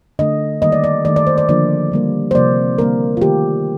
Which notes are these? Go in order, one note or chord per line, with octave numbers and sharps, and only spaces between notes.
D3 A3 D#5
D#3 G3 A#3 D#5
D5
D5
D#3 A3 D5
D5
C5
D5
D3 F3 A#3 D5
D3 G3 A#3
C5
C3 F3 A#3 D5
D3 G3 A#3 A#4
F4
D#3 A3 G4